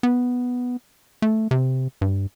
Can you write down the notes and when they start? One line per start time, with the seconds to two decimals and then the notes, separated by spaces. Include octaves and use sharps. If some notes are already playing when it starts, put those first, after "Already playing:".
0.03 B3
1.22 A3
1.51 C3
2.01 G2